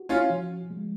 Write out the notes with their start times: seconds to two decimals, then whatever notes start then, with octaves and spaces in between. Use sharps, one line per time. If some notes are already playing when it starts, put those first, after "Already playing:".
Already playing: F#4
0.09 C#4 F4
0.30 F3
0.70 G#3